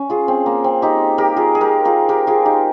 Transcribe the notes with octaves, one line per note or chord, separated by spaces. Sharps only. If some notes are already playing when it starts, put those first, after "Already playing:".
Already playing: C#4
F4 G#4
C4
A#3
C4
D#4 G4
G4 A#4
F4 G#4
G#4
G4 A#4
F4 G#4
G4 A#4
F4 G#4
D#4 G4